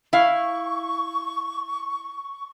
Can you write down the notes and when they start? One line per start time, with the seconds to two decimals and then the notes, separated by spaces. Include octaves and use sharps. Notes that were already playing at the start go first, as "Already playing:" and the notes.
0.13 E4 F5 C#6